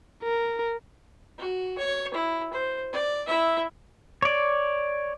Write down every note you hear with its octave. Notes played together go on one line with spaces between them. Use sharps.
A#4
F#4
C#5
E4
C5
D5
E4 E5
C#5 D5